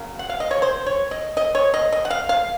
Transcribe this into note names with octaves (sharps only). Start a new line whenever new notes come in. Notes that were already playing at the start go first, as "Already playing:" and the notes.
Already playing: C#3 F#3 A#3
F#5
F5
D#5
C#5
C5
C#5
D#5
D#5
C#5
D#5
D#5
F#5
F5
F5